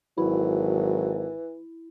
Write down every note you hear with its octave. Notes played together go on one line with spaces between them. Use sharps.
G#1 E3 F#3 E4